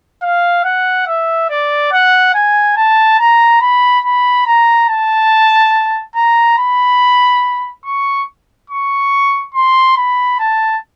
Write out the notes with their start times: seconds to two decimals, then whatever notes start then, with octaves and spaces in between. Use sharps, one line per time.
0.22 F5
0.65 F#5
1.07 E5
1.50 D5
1.92 F#5
2.34 G#5
2.76 A5
3.19 A#5
3.61 B5
4.04 B5
4.46 A#5
4.89 A5
6.15 A#5
6.58 B5
7.85 C#6
8.70 C#6
9.54 C6
9.97 B5
10.39 A5